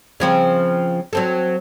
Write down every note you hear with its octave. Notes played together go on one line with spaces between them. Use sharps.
C#3 F3 C4
F#3 C4 A4